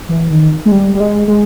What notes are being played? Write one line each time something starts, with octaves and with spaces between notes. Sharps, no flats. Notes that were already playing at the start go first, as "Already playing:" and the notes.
E3
D#3
G#3
G3
G3
G#3
G#3